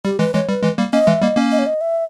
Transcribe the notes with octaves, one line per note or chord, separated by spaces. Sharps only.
G3 G4
E3 G#3 B4
E3 G#3 C#5
G3 B4
E3 G#3
G3 A#3
A#3 C#4 D#5
E3 G#3 E5
G3 A#3 D#5
A#3 C#4
D#5
C#5
D#5
E5